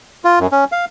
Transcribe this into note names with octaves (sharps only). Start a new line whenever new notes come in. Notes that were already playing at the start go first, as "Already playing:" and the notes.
F4
F#2
C#4
F5